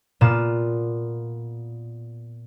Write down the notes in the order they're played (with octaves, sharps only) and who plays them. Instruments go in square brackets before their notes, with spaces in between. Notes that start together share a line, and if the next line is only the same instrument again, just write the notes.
[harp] A#2 B3 F4 E7